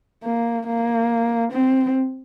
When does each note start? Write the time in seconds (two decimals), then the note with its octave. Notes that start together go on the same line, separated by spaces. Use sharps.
0.24 A#3
0.67 A#3
1.52 C4